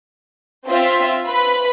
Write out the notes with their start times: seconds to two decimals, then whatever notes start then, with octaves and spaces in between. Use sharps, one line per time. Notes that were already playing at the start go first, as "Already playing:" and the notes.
0.67 C4 F4 E5
1.28 B4 B5